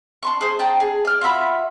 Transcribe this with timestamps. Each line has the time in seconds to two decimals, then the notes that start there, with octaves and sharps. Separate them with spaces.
0.23 D4 C6 C#6
0.41 G#4 C5
0.59 D4 G5 A5 A#5
0.80 G#4
1.05 D5 F6
1.21 F4 F#4 E5 B5